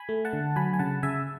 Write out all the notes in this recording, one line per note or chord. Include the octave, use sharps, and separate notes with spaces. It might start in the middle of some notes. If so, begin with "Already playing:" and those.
Already playing: G#5 B5
A3
F#5 A5
D3
F#3 G#5 B5
G#5
C#3 F#5 A5
C#3 E5 G#5